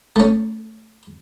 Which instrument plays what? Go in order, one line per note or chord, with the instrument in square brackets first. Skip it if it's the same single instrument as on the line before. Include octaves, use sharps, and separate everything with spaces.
[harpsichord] A3 C#4